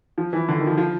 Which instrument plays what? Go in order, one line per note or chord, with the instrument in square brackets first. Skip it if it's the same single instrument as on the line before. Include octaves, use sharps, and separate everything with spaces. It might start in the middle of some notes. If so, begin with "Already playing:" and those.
[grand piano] F3
E3
D3
D#3
F3
F3